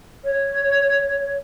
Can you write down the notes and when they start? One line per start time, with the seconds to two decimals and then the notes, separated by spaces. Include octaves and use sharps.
0.24 C#5